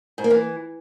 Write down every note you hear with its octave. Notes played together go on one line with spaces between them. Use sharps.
G#2
A#3
E3